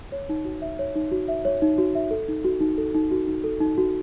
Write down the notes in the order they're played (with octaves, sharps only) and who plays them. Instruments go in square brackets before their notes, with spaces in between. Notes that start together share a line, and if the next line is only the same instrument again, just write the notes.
[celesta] C#5
D#4
F#4
E5
C#5
D#4
F#4
E5
C#5
D#4
F#4
E5
A4
D#4
F#4
D#4
A4
D#4
F#4
D#4
A4
D#4
F#4